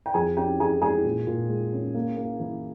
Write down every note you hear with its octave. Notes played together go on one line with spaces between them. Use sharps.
G5
F2 G#4 G#5
C#4 G4 G5
E3 G#4 G#5
G#3 G#4 G#5
A#2
A#2
G#3
C#4
A#3
A#3
E3